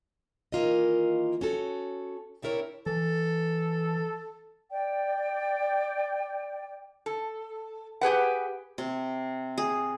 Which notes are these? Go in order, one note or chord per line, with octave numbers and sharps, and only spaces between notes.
D#3 E3 A#3 F4 A#4 D#5
C#4 F#4 A4
C4 D4 E4 A#4 B4 C#5
E3 A4
D5 G5
A4
G4 G#4 B4 F#5
C3
G#4